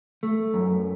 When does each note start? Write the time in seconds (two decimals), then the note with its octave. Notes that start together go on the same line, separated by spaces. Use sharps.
0.23 A3
0.54 F#2